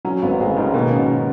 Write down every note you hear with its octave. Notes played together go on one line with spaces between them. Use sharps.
F#3 C#4
G#1 B3
G#1 G#3
C#3
G#2 D#3
B2 A#3
C#4
B2